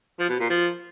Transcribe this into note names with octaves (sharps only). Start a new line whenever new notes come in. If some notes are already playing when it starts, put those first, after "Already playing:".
F3
B2
A#2
F3